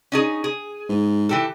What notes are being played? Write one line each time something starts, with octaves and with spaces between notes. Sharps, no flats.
C#4 D#4 G#4
G#4
G#2
E3 G4 A4